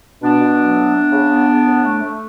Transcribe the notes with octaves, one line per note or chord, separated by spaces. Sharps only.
B2 B3 D4
B2
F#3
A3
B3
C#3
B3
B3
A2
A3
A3